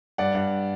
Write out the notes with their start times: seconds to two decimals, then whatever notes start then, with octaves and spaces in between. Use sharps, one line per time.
0.18 G2 D5 F#5
0.35 G2